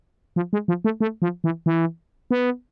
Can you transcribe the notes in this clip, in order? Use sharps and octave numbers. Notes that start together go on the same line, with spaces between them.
F3
G#3
F3
A3
A3
F3
E3
E3
B3